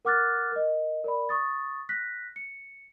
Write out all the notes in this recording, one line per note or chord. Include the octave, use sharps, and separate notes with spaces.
A#4 F#5 D6 F6 F#6 A6
A#4 D#5
A#4 D5 B5
C#6 D#6 A6
F#6 A#6 B6
C#7